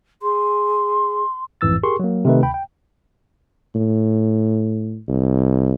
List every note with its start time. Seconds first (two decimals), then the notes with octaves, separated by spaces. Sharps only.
0.22 G#4 C6
1.61 A1 F2 G#2 E3 E6 A6
1.83 G4 G#4 A#4 C6 C#6
1.99 F#3 A#3
2.25 C3 D#3 A3 D#4 B4
2.43 D2 G5 B5
2.54 G5
3.76 A2
5.08 C2